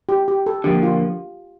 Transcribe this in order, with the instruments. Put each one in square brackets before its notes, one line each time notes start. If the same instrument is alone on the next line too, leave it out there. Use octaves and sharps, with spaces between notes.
[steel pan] G4
G4
A4
[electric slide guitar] D3 F3 A#3 [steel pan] G4
[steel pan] F4